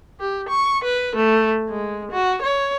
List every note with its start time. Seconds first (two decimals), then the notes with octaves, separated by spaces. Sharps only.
0.20 G4
0.49 C#6
0.84 B4
1.16 A3
1.70 G#3
2.12 F#4
2.42 C#5